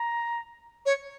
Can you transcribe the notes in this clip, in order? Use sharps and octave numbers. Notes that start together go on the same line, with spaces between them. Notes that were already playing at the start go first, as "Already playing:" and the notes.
Already playing: A#5
C#5